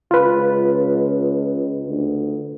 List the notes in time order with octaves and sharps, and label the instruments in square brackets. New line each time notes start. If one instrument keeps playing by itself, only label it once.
[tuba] C#2 [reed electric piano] F4 B4
[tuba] D2